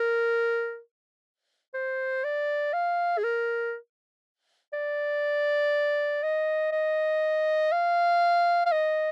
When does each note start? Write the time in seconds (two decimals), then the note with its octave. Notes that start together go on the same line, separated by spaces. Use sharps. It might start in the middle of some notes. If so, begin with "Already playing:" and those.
Already playing: A#4
1.74 C5
2.24 D5
2.73 F5
3.18 G#4
3.24 A#4
4.73 D5
6.23 D#5
6.72 D#5
7.72 F5
8.66 F5
8.72 D#5